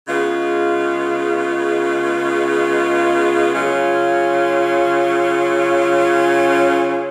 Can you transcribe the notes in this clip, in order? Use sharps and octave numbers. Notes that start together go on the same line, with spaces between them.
C#3 G#3 B3 F4
C#3 F#3 C#4 F4